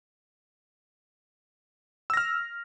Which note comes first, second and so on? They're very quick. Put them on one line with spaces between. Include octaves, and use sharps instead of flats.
E6 A#6 F6